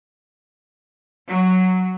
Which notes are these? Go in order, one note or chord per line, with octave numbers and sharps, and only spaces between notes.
F#3